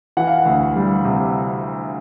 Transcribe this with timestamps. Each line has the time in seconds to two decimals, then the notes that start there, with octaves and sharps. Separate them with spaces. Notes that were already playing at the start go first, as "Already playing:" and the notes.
0.17 E3 F#5
0.27 F5
0.38 F#5
0.46 D2
0.76 G3
1.05 C3